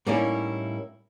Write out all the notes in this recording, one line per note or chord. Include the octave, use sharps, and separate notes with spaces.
A2 G3 A#3 C#4 D#4 E4